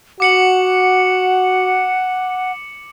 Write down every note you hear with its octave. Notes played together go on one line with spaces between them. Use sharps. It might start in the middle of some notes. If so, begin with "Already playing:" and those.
F#4 F#5 D6 C#7 F#7